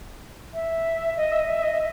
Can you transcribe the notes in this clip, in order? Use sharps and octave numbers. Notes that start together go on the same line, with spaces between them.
E5
D#5
E5
D#5
E5
D#5
E5